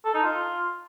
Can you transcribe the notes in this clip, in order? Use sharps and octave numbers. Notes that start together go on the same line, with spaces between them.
A4
D#4
F4